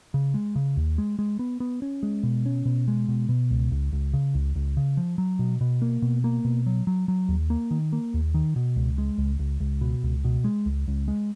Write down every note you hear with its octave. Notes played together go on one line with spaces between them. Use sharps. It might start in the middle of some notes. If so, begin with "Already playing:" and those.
C#3
G#3
C#3
D#2
G#3
G#3
B3
B3
C#4
G#3
B2
C#4
B2
G#3
B2
B2
C#2
C#2
C#2
C#3
C#2
C#2
C#3
F3
F#3
B2
B2
A#3
B2
A#3
B2
F#3
F#3
F#3
D#2
A#3
D#3
A#3
D#2
D#3
B2
C#2
G#3
C#2
C#2
C#2
B2
C#2
B2
G#3
C#2
C#2
G#3